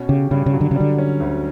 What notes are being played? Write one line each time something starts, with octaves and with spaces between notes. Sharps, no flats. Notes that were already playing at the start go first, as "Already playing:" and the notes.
Already playing: B2 C#4
C#3 G4
G2 C#3
C#3
F#3
D3
C#3
D3 G3
C#4
D2